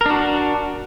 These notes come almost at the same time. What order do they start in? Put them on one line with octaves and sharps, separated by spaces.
A#4 D4 F#4